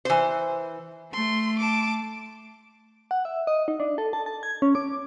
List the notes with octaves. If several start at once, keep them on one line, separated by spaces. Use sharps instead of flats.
E3 C5
A3 C6
A5 D6
F#5
E5
D#5
D#4
D4
A4
A5
A5
G#6
C#4
D6